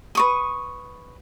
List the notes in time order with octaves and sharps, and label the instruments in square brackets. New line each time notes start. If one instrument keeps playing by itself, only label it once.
[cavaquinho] B4 C#6 D#6